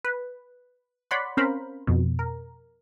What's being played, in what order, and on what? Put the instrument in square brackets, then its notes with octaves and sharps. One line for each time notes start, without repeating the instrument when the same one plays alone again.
[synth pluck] B4
C#5 D5 F#5 B5 C6
C4 C#4 A#4 C5 F5 B5
F2 B2
A#4